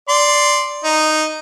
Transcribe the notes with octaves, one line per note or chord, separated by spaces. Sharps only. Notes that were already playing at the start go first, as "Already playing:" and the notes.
D5 C6
D#4